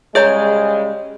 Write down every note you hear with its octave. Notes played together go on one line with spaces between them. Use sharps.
C#3 G3 G#3 G#4 C#5 D#5 A#5 G6